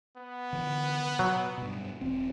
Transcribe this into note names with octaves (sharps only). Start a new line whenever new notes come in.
B3
D3 E3
B2 F#3
G2 B2
E1 E2 C4